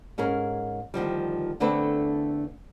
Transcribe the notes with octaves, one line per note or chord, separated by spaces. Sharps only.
G#2 C#4 G#4 A#4
D2 D#3 F3 G3
E2 D3 A3 C4 D4 B4